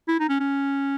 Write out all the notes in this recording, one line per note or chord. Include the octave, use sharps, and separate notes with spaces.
E4
D#4
C#4
C#4